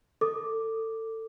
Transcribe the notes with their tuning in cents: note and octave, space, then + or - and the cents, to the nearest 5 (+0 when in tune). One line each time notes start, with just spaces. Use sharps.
A4 +25 D6 +0